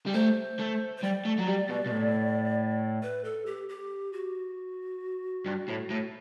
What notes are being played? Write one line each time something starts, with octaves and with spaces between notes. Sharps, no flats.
G3
A3 C5
A3
C5
G3 D5
A3
F#3
G3
B2
B2
A2
B4
A4
G4
G4
F#4
G2
A2
A2